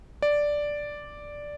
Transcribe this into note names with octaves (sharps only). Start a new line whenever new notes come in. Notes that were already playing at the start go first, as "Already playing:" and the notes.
D5